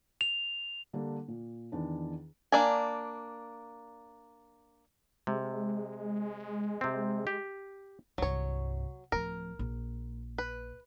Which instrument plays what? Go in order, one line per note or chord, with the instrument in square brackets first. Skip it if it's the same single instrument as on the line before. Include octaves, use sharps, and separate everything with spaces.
[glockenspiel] F7
[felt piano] D3 G3 A#3 D4
A#2
E2 D#3 D4
[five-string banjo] A#3 D4 D5 G#5
[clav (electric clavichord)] C3 [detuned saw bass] G#3
[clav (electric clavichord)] C3 C4
G4
[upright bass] C2 G2 [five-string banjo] F#3 C#5
[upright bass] D1 F3 [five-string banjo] A#4
[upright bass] A#1
[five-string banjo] B4